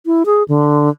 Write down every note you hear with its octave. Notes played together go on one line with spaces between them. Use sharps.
E4
G#4
D3